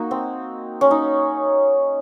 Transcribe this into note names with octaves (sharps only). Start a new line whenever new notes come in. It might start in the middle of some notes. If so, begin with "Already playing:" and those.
Already playing: A#3 D#4 F#4
C4
C#4
D#4